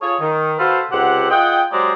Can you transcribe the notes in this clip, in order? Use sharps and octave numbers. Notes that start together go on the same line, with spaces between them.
F4 G#4 A4 C#5
D#3
F#4 A4 B4 C5 F5
C#2 C3 G4 C5 F#5
F4 G#4 D#5 F#5 G5
F#3 G#3 G4 C5 D5 A#5